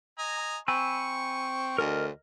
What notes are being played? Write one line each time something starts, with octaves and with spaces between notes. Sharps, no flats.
D#5 G#5 A#5
C4 G#5 B5 C#6 E6
D2 A#4 D#5